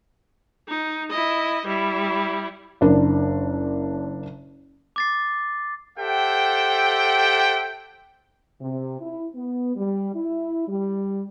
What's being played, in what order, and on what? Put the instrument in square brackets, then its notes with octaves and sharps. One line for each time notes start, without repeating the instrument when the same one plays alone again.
[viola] D#4
E4 D#5
G3 E4
[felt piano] F#1 D4 A#4 D5
[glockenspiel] D6 A6 C7
[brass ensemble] G4 A4 C5 E5 F#5 G5
[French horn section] C3
E4
B3
G3
E4
G3